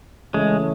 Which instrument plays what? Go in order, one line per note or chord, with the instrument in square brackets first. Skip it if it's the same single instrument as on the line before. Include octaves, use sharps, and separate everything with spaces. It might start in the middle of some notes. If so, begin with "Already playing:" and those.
[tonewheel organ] C#3 E3 A3 C#4 [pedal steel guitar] G#3